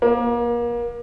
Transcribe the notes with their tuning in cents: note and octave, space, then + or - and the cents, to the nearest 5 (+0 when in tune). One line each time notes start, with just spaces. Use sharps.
A#3 +35